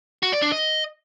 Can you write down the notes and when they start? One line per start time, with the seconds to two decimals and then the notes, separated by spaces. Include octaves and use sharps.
0.23 F#4
0.32 D5
0.42 D4
0.52 D#5